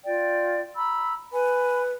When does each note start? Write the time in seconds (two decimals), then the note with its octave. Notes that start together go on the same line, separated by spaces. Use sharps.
0.05 F4 D5 G5
0.76 A#5 B5 E6
1.33 B4 G#5 B5